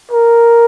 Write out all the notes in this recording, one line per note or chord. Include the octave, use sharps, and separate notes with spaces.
A#4